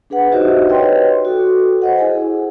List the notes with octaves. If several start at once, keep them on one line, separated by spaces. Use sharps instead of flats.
D4 G#4 B4 F#5
D#4 F#4 G4 C5 D#5 E5
B4 C#5 D#5 G5 C6
F#4 A4
C5 D#5 F#5
E4 G#4 G#5